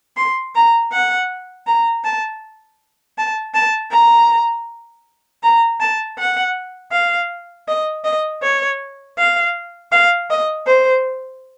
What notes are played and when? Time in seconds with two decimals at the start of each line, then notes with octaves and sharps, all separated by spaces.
0.17 C6
0.56 A#5
0.92 F#5
1.67 A#5
2.05 A5
3.18 A5
3.55 A5
3.92 A#5
5.43 A#5
5.80 A5
6.18 F#5
6.92 F5
7.68 D#5
8.04 D#5
8.42 C#5
9.18 F5
9.92 F5
10.30 D#5
10.67 C5